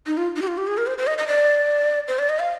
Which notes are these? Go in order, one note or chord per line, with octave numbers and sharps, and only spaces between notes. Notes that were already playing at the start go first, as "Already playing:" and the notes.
D#4
F4
D#4
G4
F4
G4
G#4
A#4
C5
C5
D#5
D#5
D5
C5
D5
D#5
F5